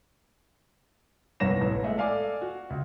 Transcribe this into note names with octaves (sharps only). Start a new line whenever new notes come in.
G1 C2 C#5 A#6 E7
A1
G#3 A3 D#5 E5
A4 D5 F5 G#5 D6
F#4
C#2